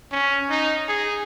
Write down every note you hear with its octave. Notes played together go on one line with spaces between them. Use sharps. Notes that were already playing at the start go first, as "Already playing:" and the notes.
C#4
D#4
G#4